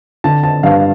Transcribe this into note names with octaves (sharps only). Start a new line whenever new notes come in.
D3 A5
A5
G2 F5